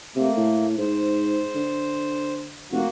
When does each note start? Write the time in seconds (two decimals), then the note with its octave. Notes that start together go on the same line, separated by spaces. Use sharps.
0.16 C3 A3 A#3
0.37 A2
0.78 G#2 C5
1.55 D3
2.72 F1 A#3 F#4